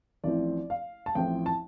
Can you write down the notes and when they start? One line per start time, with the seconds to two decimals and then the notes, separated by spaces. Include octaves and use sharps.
0.24 A1 A2 F3 C4 D5
0.70 F5
1.06 A5
1.15 A1 A2 F3 C4 G5
1.46 A5